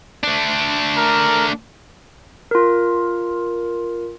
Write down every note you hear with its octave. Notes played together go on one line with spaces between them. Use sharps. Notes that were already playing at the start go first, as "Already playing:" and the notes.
A3 D4
A#4
F4 A#4